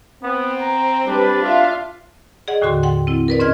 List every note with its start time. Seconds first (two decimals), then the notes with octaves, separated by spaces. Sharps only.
0.23 B3 C4
0.61 A#5
1.06 G3 D4 B4
1.43 F4 E5 F5
2.48 G#4 D5 D#5 F#5
2.62 D#2 A2 D3 F#4 C6
2.83 F#5 G5 C6
3.07 C4 E4
3.28 A#4 B4 D5
3.39 G#2 C#4 D5 D#5 F6 G#6